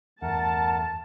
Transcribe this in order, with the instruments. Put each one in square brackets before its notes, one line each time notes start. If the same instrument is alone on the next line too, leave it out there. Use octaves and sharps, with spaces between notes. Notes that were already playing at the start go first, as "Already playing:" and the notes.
[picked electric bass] E2 G2 [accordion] A3 A#4 F#5 [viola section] A5